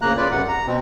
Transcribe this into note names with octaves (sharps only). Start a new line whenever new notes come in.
D2 C#3 A#3 A#5 F#6
C#3 F4 B4 D5
F#2 C3 F#5
A#5
B2 C4